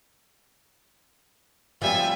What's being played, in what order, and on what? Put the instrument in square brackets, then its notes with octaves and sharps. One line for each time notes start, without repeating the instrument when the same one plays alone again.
[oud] F3 G3 C4 [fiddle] E5 G#5